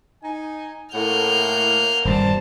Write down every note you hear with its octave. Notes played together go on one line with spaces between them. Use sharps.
D#4 G#5
A2 A3 A#3 F#5 F6 G6
D#1 G2 G3 C5 A5